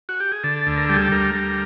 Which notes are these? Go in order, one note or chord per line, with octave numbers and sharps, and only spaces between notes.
F#4
G4
G#4
D3 A4
D2
A#4
A4
G3
G#4
A4
D2 A#4
G3